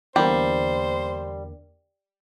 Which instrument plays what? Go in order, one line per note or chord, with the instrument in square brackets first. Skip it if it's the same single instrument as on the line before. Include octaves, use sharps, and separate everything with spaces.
[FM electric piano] E2 D3 A#3 [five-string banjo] G3 [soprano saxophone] C5